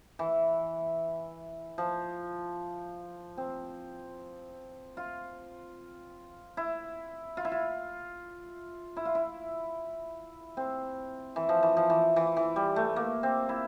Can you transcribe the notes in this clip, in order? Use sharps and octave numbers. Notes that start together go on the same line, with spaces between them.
E3
F3
C4
F4
E4
F4
E4
F4
E4
F4
E4
C4
E3
F3
E3
F3
E3
E3
E3
G3
A3
A#3
C4
E4